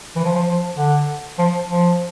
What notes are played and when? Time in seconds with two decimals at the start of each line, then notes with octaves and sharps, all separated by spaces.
0.16 E3
0.25 F3
0.35 F3
0.46 F3
0.77 D3
1.39 F3
1.69 F3